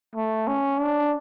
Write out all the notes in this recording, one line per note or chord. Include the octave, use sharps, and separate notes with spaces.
A3
C#4
D4